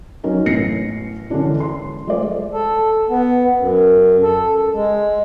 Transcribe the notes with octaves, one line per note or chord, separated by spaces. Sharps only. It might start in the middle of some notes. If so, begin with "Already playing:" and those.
F#3 C#4 D#4 A#4
A1 E3 C#4 A#6 C7 C#7
D3 E3 G#3 C#4 D4 E4
C6
F3 G#3 A3 A4 C5 D5
A4
B3
F#2
A4
G#3